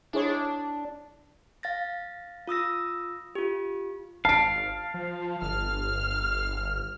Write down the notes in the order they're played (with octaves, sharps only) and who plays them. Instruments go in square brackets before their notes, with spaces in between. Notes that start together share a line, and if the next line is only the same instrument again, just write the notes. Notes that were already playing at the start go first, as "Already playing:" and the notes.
[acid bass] D4 [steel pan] E4 G#4 C#5
[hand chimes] F5 A6 A#6
F4 D#6 E6 A#6
F4 G4
[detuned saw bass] G#1 [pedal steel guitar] F5 [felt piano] A5 D7
[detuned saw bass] F3
[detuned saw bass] G1 [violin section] F6